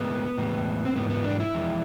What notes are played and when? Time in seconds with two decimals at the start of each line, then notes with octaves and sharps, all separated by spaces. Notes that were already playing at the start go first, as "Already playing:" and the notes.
Already playing: A2 G#3 B3
0.37 A2 E3 G#3
0.85 C4
0.96 G#2 E3 G#3 B3
1.10 B3
1.24 D4
1.40 E4
1.54 F2 E3 G#3